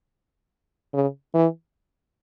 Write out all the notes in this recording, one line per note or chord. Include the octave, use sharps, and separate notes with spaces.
C#3
E3